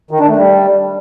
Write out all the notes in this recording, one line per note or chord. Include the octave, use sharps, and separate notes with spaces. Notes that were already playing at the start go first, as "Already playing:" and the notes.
D#3
D4
A3
G3